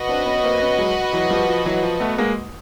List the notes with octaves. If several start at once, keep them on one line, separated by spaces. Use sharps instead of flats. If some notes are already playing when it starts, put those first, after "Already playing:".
Already playing: F#4 B4 D#5
C4 D4
B3 C#4
A#3 C4
B3 C#4
F#3 G#3
E3 F#3
F3 G3
F3
E3 F#3
F3
A3 B3
G#3 A#3